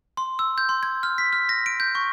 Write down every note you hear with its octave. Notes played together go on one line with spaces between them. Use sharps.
C6
E6
G6
C6
G#6
F6
B6
F6
A#6
D7
G6
C#6